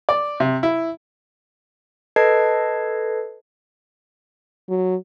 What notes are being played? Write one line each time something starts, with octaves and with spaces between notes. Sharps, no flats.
D5
C3
E4
A4 B4 D#5 A5 G#6 C7
F#3